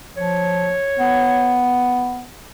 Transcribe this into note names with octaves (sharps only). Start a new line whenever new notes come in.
F3 C#5
B3